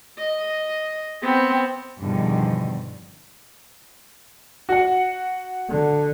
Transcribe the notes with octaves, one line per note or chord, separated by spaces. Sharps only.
D#5
B3 C4
E2 G2 B2 D3 D#3 F3
F#4 F#5
D3